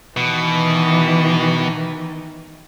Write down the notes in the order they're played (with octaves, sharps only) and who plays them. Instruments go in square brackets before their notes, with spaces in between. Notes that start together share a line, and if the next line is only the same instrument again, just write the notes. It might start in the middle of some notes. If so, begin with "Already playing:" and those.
[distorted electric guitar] B2 [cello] D#3 E3